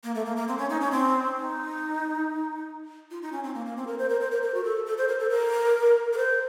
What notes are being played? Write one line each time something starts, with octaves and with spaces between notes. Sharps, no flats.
A#3
A3
A#3
A#3
C4
C#4
D#4
C#4
C4
D#4
F4
D#4
C#4
C4
A#3
A#3
C4
A#4
C5
A#4
C5
A#4
A#4
F#4
A4
A4
C5
A#4
A4
A#4
A#4
C5